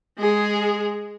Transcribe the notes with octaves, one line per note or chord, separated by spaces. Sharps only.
G#3 G#4